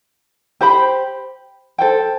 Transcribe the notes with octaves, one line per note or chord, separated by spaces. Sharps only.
G4 C5 G5 B5
A4 C5 G5